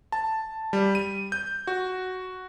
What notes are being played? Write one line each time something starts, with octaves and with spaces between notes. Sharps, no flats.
A5
G3
D#7
G6
F#4